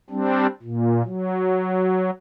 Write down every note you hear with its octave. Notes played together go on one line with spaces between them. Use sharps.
G3 C4 D4
A#2
F#3